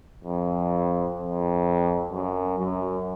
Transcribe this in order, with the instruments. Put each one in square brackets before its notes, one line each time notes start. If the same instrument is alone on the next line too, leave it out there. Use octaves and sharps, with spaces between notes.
[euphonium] F2
F2
F#2
F#2